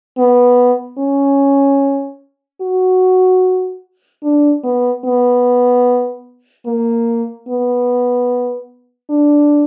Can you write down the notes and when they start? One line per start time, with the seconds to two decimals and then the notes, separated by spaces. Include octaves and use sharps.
0.18 B3
0.98 C#4
2.61 F#4
4.23 D4
4.64 B3
5.05 B3
6.66 A#3
7.48 B3
9.10 D4